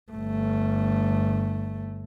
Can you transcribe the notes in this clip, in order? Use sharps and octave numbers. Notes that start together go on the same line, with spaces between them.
G1 A3